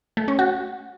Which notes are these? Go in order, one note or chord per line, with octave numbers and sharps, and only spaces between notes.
A3
C#4
F#4